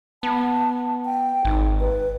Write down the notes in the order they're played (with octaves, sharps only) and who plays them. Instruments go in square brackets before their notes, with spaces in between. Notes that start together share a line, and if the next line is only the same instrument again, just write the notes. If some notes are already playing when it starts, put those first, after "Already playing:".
[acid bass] B3 [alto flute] A5
[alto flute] G5
[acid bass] G#1 [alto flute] D#4
[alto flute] B4